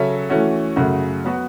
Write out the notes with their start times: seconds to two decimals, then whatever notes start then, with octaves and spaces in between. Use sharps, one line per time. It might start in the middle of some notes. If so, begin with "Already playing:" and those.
Already playing: C#3 F#3 C#4 A4 E5
0.30 E3 A3 C#4 F#4
0.76 F#2 C#3 A3 F#4
1.25 F#3 B3 F#4